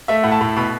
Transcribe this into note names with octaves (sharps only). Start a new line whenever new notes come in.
A3 E5
A2 F#5
A5
A2
B2 B5